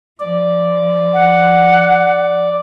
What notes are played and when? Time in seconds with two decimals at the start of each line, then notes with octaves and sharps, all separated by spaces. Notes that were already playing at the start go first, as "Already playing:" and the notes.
0.20 F3 D5
1.13 F#5